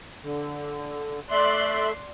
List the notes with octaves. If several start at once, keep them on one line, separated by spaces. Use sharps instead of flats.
D3
A3 D5 E5 C6 F#6